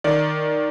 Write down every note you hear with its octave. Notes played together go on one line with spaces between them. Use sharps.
D#3 D5